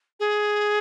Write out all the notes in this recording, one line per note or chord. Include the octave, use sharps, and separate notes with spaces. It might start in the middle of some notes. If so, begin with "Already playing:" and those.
G#4